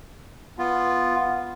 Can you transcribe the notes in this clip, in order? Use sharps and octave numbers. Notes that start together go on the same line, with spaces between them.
B3 F4